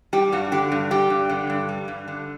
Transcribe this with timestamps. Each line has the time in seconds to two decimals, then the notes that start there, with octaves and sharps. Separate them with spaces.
0.13 G3 G4
0.32 G2 F#4
0.52 D3 G4
0.72 G2
0.91 G3 G4
1.10 G2
1.29 D3
1.50 G2
1.69 G3
1.88 G2
2.08 D3